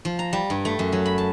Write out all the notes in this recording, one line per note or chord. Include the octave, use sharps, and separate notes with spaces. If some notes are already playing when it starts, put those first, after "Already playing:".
F3
A#5
G3
G2
A3
F#2
F#3
B5
A5